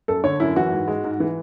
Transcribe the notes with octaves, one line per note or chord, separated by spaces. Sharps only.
F#2 A4
D3 C#5
F#2 E4
E3 F#4
G#2
G#3
G#2
E3